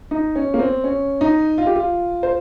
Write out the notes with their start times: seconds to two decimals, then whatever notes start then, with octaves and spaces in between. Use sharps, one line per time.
0.11 D#4
0.35 C#4
0.54 A#3
0.59 C4
0.84 C#4
1.21 D#4
1.58 F4
1.67 G4
1.76 F4
2.23 C5